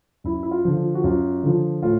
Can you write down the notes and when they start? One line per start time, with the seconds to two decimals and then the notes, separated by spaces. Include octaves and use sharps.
0.24 F#2 E4
0.43 E4
0.51 F4
0.65 D3 F3
0.77 F4
0.95 F#4
1.04 F#2 F4
1.43 D3 F3
1.83 A2 F4